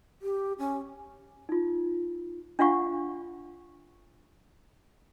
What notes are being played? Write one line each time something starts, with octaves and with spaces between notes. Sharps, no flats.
G4
C#4
D#4 F4
D4 F4 F5 F#5 C#6